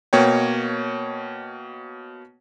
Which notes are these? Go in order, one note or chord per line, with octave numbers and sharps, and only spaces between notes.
B2 A#3 C#5 G5